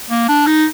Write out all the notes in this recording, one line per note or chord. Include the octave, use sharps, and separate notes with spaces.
A#3
D4
D#4